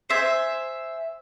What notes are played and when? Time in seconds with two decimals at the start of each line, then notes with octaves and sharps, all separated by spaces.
0.10 C5 E5 G#5